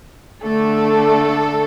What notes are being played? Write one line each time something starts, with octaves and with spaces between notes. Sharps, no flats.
D3 A3 D4 A4